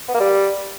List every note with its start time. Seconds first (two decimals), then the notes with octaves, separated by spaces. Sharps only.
0.08 B3
0.14 A#3
0.20 G3